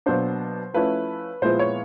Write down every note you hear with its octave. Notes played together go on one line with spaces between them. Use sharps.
B2 F#3 A#3 D4 C5
F3 A3 C#4 E4 B4
A#2 F3 G#3 B3 E4 C5
C#5